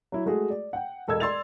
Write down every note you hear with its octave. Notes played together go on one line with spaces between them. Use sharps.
F#3 E4
G#3 A3 F#4 G#4
D5
F#5 G5
E1 A4 D#5 E6 G#6
D5 C6 E6 A6 F7